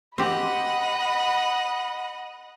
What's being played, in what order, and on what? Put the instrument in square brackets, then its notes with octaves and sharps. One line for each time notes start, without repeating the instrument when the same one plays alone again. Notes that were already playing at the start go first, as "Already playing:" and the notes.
[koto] C4 G4 [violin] D#5 F#5 [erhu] B5